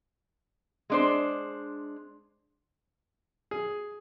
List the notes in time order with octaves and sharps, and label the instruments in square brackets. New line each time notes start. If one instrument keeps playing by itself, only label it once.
[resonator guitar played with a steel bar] G#3 D4 C5
[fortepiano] G#4